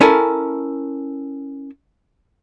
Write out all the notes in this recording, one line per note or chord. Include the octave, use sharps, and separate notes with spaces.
C#4 E4 A4 A#4 G#5